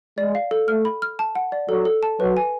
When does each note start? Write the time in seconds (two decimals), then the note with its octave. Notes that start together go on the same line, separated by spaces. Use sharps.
0.18 G#3 D5
0.35 F5
0.51 A4
0.68 A3 F6
0.85 B5
1.02 F6
1.19 A5
1.35 F#5
1.52 D5
1.69 F#3 A4
1.85 A4
2.03 A5
2.20 F#3 B4
2.37 G#5